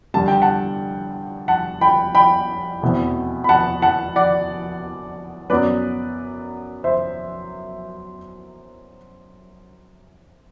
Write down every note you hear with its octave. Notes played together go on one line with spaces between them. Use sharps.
G2 D3 G3 A5
G5
F#5 A5
F#5 A5
G5 B5
G5 B5
E2 B2 A3 C4
B5
F#5 A5
F#5 A5
D5 F#5
F#2 F#3 B3 B4 D5
C5 E5